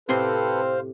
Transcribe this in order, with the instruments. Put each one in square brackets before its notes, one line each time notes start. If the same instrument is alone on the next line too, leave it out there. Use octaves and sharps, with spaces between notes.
[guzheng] A2 C3 C6 [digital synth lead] C4 [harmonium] A4 B4 [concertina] C5 F5